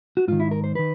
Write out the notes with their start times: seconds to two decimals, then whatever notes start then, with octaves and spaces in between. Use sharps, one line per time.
0.17 F#4
0.28 G#2 D#3 F4
0.40 E4
0.51 A#4
0.64 C5
0.75 D#3 B4